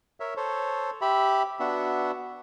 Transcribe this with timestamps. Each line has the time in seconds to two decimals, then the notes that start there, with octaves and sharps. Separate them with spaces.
0.20 A#4 C#5 E5
0.37 A4 C5 C#5
1.01 G4 E5 B5
1.60 B3 D4 F#4 E5